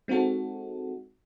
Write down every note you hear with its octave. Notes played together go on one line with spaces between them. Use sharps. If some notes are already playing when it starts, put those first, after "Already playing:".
G#3 C4 D#4 F#4 A4